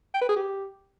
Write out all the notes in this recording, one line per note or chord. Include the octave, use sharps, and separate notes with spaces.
G5
B4
G#4
G4